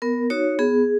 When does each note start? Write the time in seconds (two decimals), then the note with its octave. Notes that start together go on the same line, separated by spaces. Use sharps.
0.02 B3 A#4
0.30 D#4 F#4 C#5
0.59 B3 G#4